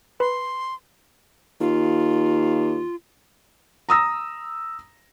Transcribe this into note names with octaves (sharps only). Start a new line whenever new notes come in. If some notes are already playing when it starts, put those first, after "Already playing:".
B4 B5 C6
D#2 F4
A#5 D#6 E6 A#6